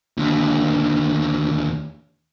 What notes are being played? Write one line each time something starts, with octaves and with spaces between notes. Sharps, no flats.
D#2 D3